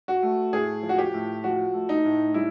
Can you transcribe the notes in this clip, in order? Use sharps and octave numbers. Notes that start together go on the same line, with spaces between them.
F#4
A3
A2 G#4
F3
F#4
G4
A2
F3 F#4
A3
D#4
A2
G3 E4